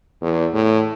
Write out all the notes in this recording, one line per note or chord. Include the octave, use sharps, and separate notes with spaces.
E2
A2